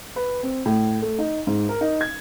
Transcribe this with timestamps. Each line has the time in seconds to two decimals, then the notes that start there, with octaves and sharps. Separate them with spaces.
0.16 B4
0.43 C4
0.66 A2
1.02 A3
1.19 D#4
1.47 G#2
1.69 A#4
1.81 D#4
2.01 G#6